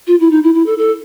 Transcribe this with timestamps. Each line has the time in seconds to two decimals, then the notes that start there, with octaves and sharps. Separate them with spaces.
0.07 F4
0.20 E4
0.31 D#4
0.43 E4
0.54 E4
0.66 A4
0.78 A4